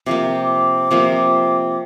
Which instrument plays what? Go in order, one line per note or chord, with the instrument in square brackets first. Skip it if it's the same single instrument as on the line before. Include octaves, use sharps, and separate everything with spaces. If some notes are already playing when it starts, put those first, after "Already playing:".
[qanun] C3 F3 A#3 [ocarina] D6
[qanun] C3 F3 A#3